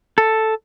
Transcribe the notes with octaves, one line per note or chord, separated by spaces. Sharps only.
A4